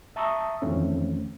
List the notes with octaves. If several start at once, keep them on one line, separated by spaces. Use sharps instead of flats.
E5 A5 A#5 C#6 D#6 E6
F2 D#3 E3 A3 C4 C#4